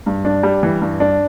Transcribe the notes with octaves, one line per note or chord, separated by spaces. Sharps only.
G2
D4
G3
E3
G2
D4